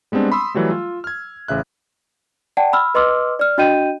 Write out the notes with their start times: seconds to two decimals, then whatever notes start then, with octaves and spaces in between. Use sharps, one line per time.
0.12 G3 G#3 B3 C4 D4
0.32 B5 C6 D#6 E6
0.55 E3 F#3 G3 A3
0.71 F4
1.04 F6 G#6
1.48 A1 C#3 E5 F#6
2.57 D5 F#5 G5 A5
2.73 B5 E6 F6
2.95 B4 D#5 C6 D6 E6 F6
3.39 D5 F6
3.58 D4 F#4 D#5 G5 G6 D#7